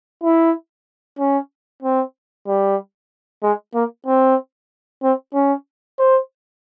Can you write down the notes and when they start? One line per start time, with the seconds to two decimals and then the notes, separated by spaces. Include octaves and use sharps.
0.23 E4
1.19 C#4
1.82 C4
2.47 G3
3.43 G#3
3.74 A#3
4.06 C4
5.03 C4
5.34 C#4
5.99 C5